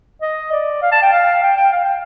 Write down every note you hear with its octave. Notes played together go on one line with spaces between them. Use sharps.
D#5
D5
F5
A5
G5
F5
G5
G5
F5
G5